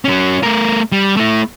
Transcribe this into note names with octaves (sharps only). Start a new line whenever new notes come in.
F#3 C#4
A3 A#4
G3
A3 E4